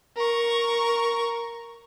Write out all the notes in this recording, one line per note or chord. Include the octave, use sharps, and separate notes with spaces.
A#4 C#6